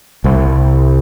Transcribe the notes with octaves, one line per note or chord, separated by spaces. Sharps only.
C2